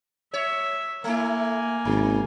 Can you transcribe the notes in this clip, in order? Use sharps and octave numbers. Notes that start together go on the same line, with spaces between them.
C#5 E5
A3 A#3 E4 G#5
G#1 C3